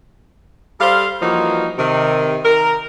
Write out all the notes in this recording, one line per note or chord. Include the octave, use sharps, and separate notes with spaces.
G3 A4 C5 F5
E3 F3 G3 A#3 D#4 F#4
C3 D#3
A#4